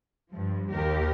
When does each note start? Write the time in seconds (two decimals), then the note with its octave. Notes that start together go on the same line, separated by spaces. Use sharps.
0.31 G2 F3
0.71 D#2 G4 A#4